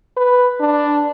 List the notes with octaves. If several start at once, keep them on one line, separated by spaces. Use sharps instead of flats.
B4
D4